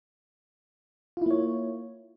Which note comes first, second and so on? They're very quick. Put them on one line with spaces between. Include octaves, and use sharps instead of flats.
F4 E4 A#3 C#5